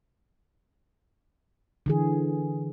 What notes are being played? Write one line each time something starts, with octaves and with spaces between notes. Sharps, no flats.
D3 E3 G#4